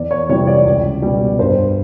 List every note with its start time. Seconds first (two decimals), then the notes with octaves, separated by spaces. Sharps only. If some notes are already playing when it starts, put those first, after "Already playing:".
Already playing: E2 D5
0.11 C#5
0.29 C3 E3 G3 C#5
0.47 D5
0.66 C#2
1.02 B2 G3
1.39 G2 C5